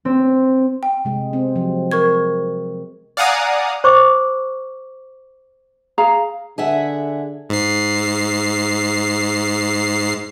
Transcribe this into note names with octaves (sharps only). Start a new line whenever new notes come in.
C4
G5
C3 G#3
C4
F3 F#3
A#4 C#6 G#6
D5 F5 F#5 G#5 A#5 D#6
C5 C#6 D6
G#4 F5 A#5
D3 G#4 E5 F#5
G#2 C7